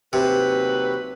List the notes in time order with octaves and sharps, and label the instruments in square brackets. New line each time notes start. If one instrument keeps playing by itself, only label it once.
[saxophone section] D#2 F#3 B4 [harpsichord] C3